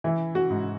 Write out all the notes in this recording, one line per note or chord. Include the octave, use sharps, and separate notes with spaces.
E3 E4
F#4
G#2